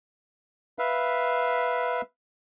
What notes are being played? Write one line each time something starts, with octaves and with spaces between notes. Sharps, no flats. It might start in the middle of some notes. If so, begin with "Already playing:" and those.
B4 E5 F5